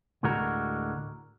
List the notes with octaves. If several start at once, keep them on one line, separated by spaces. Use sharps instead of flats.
D2 A2 D3 G#3 F#4 A#4